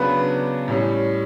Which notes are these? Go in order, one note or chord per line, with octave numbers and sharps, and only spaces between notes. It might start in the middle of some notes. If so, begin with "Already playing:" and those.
Already playing: C#3 F#3 B3 D4 B4
A2 G3 C#4